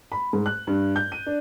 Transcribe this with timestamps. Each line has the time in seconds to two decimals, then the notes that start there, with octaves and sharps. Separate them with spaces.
0.12 B5
0.33 G#2
0.46 F#6
0.67 G2
0.96 G6
1.12 D#7
1.26 D4